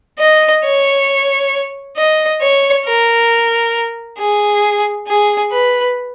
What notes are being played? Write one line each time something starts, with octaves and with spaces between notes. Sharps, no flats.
D#5
C#5
D#5
C#5
A#4
G#4
G#4
B4